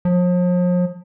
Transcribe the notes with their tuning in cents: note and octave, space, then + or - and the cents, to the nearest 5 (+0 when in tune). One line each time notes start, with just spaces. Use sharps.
F3 +40